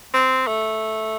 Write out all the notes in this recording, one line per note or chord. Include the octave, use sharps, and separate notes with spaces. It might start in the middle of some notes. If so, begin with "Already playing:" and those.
C4
A3